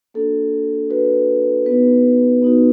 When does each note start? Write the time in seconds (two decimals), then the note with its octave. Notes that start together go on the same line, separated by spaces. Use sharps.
0.14 A#3 D4 F#4 A4
0.90 A#3 D4 F#4 B4
1.66 B3 D#4 F#4 B4
2.42 B3 D#4 F#4